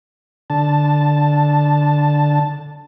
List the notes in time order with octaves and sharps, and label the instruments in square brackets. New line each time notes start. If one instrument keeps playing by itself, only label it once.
[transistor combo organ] D3 A5